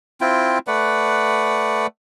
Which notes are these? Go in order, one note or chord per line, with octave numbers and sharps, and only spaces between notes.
C4 E4 F4 G5
A3 B4 D5 F#5